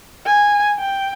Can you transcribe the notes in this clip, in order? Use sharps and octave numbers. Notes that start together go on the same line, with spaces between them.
G#5
G5